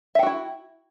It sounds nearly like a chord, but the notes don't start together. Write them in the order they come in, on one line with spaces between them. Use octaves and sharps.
E5 G5 F#4 E4